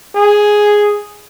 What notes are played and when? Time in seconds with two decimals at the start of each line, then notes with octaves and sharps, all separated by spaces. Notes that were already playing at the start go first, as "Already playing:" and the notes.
0.15 G#4